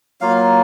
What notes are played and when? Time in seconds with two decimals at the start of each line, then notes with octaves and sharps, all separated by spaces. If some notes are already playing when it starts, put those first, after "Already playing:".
0.21 F#3 A#3 F4 F5